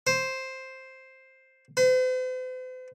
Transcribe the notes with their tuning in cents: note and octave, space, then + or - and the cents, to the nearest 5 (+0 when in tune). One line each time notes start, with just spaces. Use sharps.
C5 +5
C5 -45